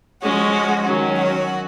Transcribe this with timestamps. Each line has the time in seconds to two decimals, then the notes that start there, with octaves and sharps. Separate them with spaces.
0.21 F3 G#3 C#4 F#4
0.84 D#3 F#3 C#4
1.15 F#4